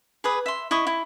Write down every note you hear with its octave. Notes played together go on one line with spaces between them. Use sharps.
G#4 B4 D#6
E5 C6
E4 D#5 C#6 D#6
E4